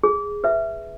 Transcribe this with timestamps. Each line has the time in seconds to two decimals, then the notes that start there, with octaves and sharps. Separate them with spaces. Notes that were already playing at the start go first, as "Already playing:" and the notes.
0.03 G#4
0.44 B4 E5